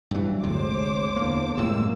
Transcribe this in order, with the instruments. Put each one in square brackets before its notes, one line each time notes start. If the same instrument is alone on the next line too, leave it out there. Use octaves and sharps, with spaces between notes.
[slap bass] G2 F#3 [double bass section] E3
[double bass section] G#1 G#2 G#3 [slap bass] D2 C3 [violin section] C5 C#5 D6
[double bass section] E2 A#2 D3 [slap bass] A#3
[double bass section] F#2 G#3 A#3 [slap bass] A2 C3 [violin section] E6